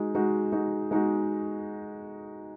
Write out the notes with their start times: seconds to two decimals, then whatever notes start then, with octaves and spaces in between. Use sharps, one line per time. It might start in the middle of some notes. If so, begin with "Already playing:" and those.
Already playing: G#3 D#4 F#4
0.15 G#3 D#4 F#4
0.52 G#3 D#4 F#4
0.91 G#3 D#4 F#4